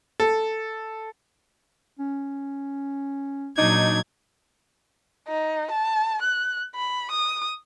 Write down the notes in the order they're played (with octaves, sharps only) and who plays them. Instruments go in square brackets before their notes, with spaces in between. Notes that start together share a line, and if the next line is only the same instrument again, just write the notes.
[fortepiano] A4
[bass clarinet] C#4
[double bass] A#2 F#3 [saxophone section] D4 D#4 [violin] G#6
[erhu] D#4
A5
F#6
B5
D#6